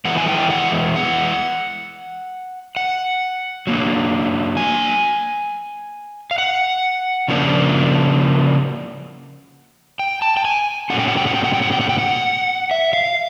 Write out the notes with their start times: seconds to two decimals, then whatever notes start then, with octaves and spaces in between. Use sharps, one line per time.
0.05 E3 G#3 B3 E4 F#5
0.18 G#5
0.28 G5
0.50 F#5
0.96 F#5
2.77 F#5
3.67 F#3 A#3 D4
4.57 G#5
6.31 F5
6.38 F#5
7.28 C#3 F3 A#3 D4
9.99 G5
10.22 A5
10.37 G5
10.45 G#5
10.90 A#2 F#3 A3 C#4 F#5
10.99 G5
11.08 F#5
11.17 G5
11.27 F#5
11.35 G5
11.44 F#5
11.54 G5
11.62 F#5
11.72 G5
11.81 F#5
11.89 G5
11.99 F#5
12.71 E5
12.93 F5